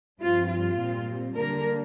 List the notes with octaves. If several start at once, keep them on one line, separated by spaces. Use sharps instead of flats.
G2 F3 C4 F4
F4
A#2 G3 C4
D3 G3 A#3 D4 A#4